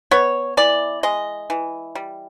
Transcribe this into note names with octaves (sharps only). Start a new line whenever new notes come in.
B3 C#5
E3 D5
G#3 D#5
E3
G3